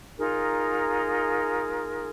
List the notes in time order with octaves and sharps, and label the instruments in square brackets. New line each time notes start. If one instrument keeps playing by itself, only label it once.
[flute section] D#4 F4 G#4 A#4